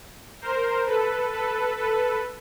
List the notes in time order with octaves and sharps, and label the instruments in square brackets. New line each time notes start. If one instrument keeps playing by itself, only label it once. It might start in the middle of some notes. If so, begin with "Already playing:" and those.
[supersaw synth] A#4 C5
A4 B4
A4 B4
A4 B4